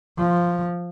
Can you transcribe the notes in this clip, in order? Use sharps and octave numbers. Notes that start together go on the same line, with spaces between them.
F3